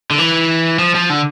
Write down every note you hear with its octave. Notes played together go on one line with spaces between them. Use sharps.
D3
E3
F3
F3
D3